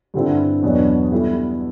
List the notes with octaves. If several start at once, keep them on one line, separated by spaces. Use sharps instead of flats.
G2 D3 G3 C4 E4
E2 B2 F#3 B3 D4
G3 B3 E4 A4